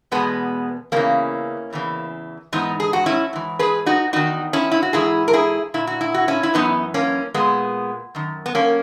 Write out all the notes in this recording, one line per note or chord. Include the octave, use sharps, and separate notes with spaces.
E2 B2 G#3 B3
E2 C#3 E3 A#3 C#4
E2 C#3 E3
G#2 E3 B3 D#4
G#4
F#4
C#4 E4
G#2 E3
G#4 B4
D#4 F#4
E2 D#3 D#4 F#4
C#4 E4
E4
F#4
G#2 E3 E4 G#4
A#4
E4 G#4
A#2 E4
F#4
E4
F#4
C#4 E4
E4
F#2 E3 B3 D#4
A#3 C#4
A#2 G#3 B3
F#2 D#3
B3
A#3 C#4